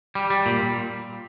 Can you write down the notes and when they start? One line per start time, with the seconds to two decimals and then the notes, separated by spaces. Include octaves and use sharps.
0.15 G3
0.30 G3
0.46 A#2